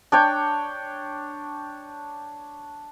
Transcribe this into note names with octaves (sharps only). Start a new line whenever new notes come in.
D4 C#5 G5